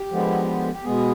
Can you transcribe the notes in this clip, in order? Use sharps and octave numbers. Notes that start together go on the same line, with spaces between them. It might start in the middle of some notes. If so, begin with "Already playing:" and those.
Already playing: G4
D3 F3 G#3 B3
G4
B2 G#3 B3 G#4